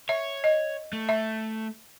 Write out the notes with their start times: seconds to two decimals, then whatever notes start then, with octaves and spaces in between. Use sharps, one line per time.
0.09 C#5 E5
0.44 D#5
0.93 A3
1.09 E5